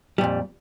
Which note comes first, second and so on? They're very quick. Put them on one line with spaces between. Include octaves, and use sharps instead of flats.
G3 A#2 F2